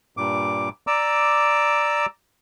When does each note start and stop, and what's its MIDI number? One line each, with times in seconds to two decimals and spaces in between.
0.17 0.69 43
0.17 0.69 46
0.17 0.69 86
0.87 2.06 74
0.87 2.06 82
0.87 2.06 86
0.87 2.06 88